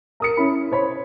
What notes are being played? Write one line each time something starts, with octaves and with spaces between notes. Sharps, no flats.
A#4 D#6 C#7
C#4 E4 B5
C5 C#5 B5